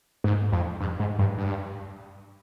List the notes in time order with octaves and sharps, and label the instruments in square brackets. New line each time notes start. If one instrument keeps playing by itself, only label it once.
[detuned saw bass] G#2
F2
G2
G#2
G2
G2